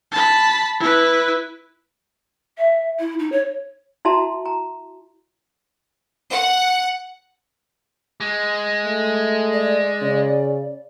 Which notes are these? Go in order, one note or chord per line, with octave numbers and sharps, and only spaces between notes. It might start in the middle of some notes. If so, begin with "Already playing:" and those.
A5 B5
E4 B4
E5
E4
D#4
C#5
E4 F#4 E5 A5 A#5 C6
A#5
F#5
G#3
A3
D5
C#3